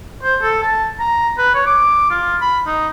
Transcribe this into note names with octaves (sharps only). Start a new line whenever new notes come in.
C5
A4
A5
A#5
B4
C#5
D6
F4
B5
D#4